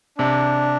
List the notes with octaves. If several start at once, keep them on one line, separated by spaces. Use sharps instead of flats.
C3 D4